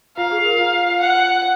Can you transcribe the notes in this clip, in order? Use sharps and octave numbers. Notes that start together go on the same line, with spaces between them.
F4 F5
G#4
A#4
F4
F#5